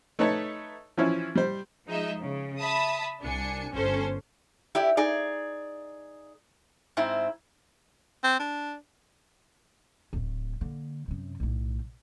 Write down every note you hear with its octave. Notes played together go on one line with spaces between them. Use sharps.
A3 D#4 B4 C#5 A5
E3 F3 C#4 E4
G3 C5
F3 G#3 D#4 D#5 E5
C#3
E5 A5 B5 D#6
C2 D4 G#5 C#7
G1 C#4 A4 C5
E4 G4 D5
D#4 G#4 D5
G#2 C4 E4
C4
D4
D1 A3
D3 A#3
F#2 C3
B1 A2